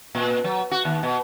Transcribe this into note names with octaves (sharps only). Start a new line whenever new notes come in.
A#2
F#3
F#4
D#2
B2